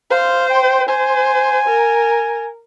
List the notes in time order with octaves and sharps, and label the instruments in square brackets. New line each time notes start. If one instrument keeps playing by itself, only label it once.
[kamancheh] C5 [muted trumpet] F5
[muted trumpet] G5
[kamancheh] C5 [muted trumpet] G#5
[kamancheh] A#4